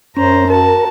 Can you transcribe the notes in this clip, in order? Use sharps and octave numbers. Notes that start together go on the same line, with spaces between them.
F#2 C#4 C5 A#5
F#4 A#4 A5